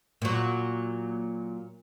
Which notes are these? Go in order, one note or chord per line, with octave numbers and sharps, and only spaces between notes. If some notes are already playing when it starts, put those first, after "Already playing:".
A#2 F#3